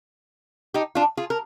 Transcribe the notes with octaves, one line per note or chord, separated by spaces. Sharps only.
D#4 G4
D4 F4
F4 G#4
A#4